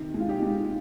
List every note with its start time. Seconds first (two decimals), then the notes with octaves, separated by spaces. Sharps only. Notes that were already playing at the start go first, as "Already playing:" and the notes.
Already playing: C3 D#3 D#4
0.14 G#3
0.20 F4
0.29 D#4 G4
0.42 G#3